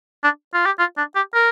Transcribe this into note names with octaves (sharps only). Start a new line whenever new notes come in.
D4
F4
G4
F4
D4
G4
A#4